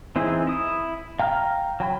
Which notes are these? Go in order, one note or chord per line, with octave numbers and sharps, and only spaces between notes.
E3 C4 D#4 E4 G#4
E4 D#6
F5 G5 A#5 F6
F#3 G5 B5